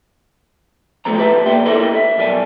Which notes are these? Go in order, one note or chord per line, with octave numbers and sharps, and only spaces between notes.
C#2 G#2 F3 A3 C4 A#5
G4 B4 E5 A5
A#2 A#3 E5 G5 C6
E4 G4 A4 A#4 C#5 D#5
E5
B1 G3 A#4 G#5 A5